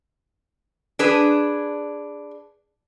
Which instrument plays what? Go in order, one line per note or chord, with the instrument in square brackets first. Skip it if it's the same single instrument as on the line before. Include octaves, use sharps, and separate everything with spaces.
[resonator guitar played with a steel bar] D4 G#4 B4